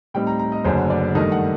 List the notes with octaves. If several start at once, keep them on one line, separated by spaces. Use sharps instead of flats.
A2 G3 C4 D#4 G5
A#5
A#5
D#5
F#1 F#2 D3 F#3 A3 C5
D5
G2 D#3 A3 D#4 D#5
F#5